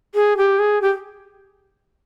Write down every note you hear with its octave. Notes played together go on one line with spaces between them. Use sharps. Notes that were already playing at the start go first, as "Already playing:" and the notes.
G#4
G4
G#4
G4